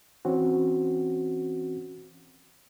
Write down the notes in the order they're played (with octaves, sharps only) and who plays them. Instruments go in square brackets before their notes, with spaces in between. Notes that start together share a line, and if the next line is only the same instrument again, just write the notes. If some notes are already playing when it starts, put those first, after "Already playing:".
[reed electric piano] E3 C4 C#4 F#4